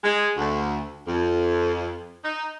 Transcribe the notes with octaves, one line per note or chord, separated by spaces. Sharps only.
G#3
D2
F2
D#4